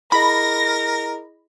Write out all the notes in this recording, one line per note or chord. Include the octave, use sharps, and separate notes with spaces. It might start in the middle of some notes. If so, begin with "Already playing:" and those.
E4 G#4 A#4 D#5 B5 A#6